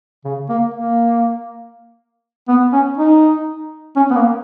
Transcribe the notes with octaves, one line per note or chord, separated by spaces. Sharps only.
C#3
A#3
A#3
B3
C#4
D#4
C#4
B3
A#3